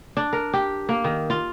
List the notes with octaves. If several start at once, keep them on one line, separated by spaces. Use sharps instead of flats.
D4
A#4
G4
A#3
D#3
F4